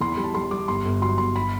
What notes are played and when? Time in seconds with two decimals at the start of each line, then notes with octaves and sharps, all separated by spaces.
0.01 E2 C6
0.12 B5
0.17 G3
0.24 A5
0.34 G3 C6
0.51 G3 D6
0.68 G1 C6
0.85 G1
1.02 F#3 C6
1.18 G1 C6
1.36 B5